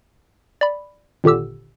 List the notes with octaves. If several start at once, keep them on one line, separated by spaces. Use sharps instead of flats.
D5 B5
G#1 A#2 D3 G4 E6